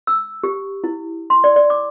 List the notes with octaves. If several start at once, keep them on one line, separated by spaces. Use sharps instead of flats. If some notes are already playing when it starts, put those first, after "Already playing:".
E6
G4
E4
C6
D5
D5
D6